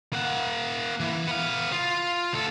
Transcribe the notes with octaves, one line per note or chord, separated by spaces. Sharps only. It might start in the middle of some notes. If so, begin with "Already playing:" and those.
A#3 F#5
E3
B3 F5
F4
D2 A4